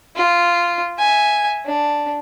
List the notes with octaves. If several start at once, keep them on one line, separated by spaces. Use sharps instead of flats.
F4
E5 G#5
D4